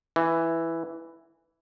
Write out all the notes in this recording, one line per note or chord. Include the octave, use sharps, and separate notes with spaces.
E3